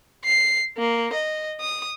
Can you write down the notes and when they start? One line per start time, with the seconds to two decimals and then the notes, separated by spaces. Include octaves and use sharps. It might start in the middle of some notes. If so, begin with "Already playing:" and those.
0.24 C7
0.78 A#3
1.13 D#5
1.61 D#6